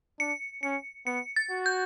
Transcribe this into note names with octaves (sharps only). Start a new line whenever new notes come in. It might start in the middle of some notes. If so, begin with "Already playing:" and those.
D4 C#7
C#4 C#7
B3 C#7
A6
F#4
G6